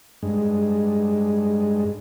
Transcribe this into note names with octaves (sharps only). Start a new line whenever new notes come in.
G2 G#3